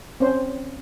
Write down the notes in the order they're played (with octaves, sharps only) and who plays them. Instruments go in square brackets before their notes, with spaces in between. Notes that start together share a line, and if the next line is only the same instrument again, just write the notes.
[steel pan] C4 C#4 C5